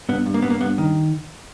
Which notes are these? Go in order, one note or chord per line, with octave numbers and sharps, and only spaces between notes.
G2 B3
G2
A#3
G2 B3
A#3
G2 B3
D#3